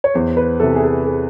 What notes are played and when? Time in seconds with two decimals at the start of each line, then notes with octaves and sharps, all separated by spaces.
0.04 C#5
0.14 E2 C5
0.37 B4
0.60 C3 E3 A4
0.76 G#4
0.82 A4
1.05 A4